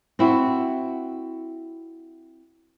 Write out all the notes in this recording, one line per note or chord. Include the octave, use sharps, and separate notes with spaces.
C4 E4 F#4